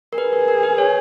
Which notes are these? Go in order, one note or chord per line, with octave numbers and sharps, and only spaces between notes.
A#4
G#4 B4
A#4
A#4
B4
C#5